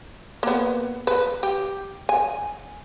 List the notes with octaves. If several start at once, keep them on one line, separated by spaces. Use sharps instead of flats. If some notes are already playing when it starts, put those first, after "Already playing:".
A#3 B3
B4
G4
G#5